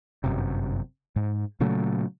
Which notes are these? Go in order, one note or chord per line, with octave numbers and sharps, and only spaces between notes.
G1 F#2 C3
G#2
A#2 C#3 F#3 A3